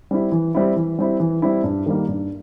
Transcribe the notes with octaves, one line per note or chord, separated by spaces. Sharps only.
G3 C4 E4
E3
G3 C4 E4
E3
G3 C4 E4
E3
G3 C4 E4
G2
D#3 G3 A#3
G2